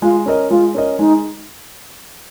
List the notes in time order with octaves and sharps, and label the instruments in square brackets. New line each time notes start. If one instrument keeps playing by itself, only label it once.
[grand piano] G#3 [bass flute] F4
[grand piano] C#4 A#4 D#5
[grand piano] G#3 [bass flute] F4
[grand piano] C#4 A#4 D#5
[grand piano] G#3 [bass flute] D#4